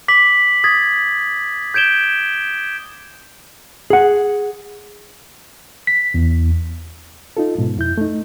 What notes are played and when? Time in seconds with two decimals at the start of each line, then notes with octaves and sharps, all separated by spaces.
0.08 D6 B6 F#7
0.64 D#6 G#6 A6 B6
1.74 G6 G#6 D7 E7 G7
3.90 G#4 F#5
5.87 B6
6.14 E2
7.37 D#4 F4 A4
7.58 G#2 B2
7.77 F2 E4 G6
7.98 A3 D#4